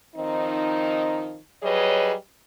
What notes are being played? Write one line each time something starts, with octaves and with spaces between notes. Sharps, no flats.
D#3 F3 C4 D#4
F#3 G3 G#4 B4 C#5 D#5